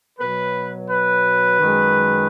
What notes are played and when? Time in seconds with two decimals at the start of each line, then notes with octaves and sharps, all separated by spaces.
0.19 B2 F#3 B4
0.89 B4
1.59 F#2 D#3 G#3